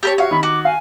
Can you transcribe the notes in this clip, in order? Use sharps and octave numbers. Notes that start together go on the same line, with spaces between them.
G4 A#4 C#5 A5
F#4 C#5 E5 F5
D#3 B5
F#4 D6
F5 G#5